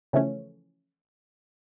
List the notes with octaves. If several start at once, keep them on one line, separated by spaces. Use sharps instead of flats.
C#3 E3 F3 A3 C#4